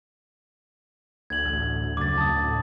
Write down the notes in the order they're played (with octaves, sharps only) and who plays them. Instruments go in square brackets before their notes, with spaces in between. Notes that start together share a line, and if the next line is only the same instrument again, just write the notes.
[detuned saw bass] D2 [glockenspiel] G#6 F#7
[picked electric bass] A1
[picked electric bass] F2 C#3 F#3 [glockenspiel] D6 A6
[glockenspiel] A5 D#6
[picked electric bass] A2